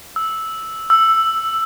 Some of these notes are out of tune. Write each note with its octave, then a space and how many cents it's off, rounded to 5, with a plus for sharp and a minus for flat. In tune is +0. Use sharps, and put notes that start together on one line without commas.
E6 -10
E6 +5